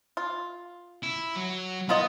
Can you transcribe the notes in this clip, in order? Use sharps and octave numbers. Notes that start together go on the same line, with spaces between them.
F4
E4
F#3
A#3 B3 F4 D#5